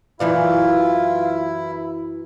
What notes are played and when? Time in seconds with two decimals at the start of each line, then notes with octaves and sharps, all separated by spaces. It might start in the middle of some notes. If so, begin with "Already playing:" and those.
0.20 F#2 E3 E4 F4 D5